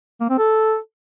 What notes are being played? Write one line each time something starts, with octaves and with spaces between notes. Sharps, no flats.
A#3
C4
A4